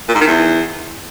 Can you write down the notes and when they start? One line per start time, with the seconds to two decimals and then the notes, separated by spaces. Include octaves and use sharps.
0.09 A#2
0.15 G#2
0.21 D#3
0.27 E2